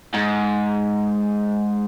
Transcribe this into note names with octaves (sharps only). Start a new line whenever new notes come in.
G#2